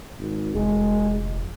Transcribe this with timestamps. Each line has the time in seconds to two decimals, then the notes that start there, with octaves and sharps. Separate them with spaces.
0.20 G#1
0.55 F1 G#3